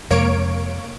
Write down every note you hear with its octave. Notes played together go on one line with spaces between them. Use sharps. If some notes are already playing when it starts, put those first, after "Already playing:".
F2 C3 G#3 A#3 C#5 D7